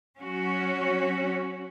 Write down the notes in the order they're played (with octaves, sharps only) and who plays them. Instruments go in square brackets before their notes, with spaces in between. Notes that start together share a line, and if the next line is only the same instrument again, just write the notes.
[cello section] F#3 C#4 F#4